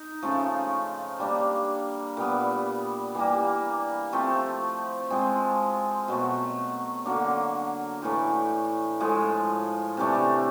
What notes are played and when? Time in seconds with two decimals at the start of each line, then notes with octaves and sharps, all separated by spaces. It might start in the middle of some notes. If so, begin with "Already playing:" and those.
Already playing: D#4
0.22 C#3 F3 A3
1.19 G3 A#3 D4
2.17 A#2 G3 B3
3.15 E3 G3 A#3
4.13 F3 A3 C4
5.10 F3 G#3 C4
6.08 B2 F#3 A3
7.05 D3 F#3 A#3 D4
8.02 A2 E3 A3
9.00 A2 F3 G#3
9.97 C3 E3 A3 D4